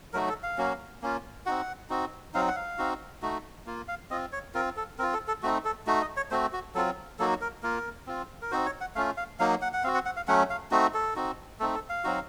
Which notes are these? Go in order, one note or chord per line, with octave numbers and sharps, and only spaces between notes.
F#3 A3 D#4 F#4 A#4
A4
F5
F#3 A#3 C#4 F#4
A#3 C#4 F4
C4 D#4 F#4 F#5
C4 D#4 F#4
F#3 C4 D#4 F5
F#5
F5
C4 D#4 F#4
A3 D#4 F#4
A#3 F4
F5
C4 F4 D#5
C#5
C4 F4 A#4
A4
C4 F4 A#4
A4
A4
A3 C4 D#4 F#4
A4
A3 D#4 F#4
D#5
C#5
A3 C4 F#4 C5
F#4
F#3 C4 F4 A4
F#3 A#3 D#4 F#4 A4
A#4
A#3 F4 A#4
C4 F4
A#4
C4 D#4 F#4 C5
C#5
F#5
A3 C#4 F4 F5
F5
F#3 A#3 D#4 F5
F#5
F#5
C4 F#4 F5
F#5
F#5
F5
F#3 A3 C#4 F#5
F5
A3 C4 D#4 F#4
A4
C4 D#4 F#4
A3 C4 D#4 A4
A4
F5
F#3 C4 D#4 F#4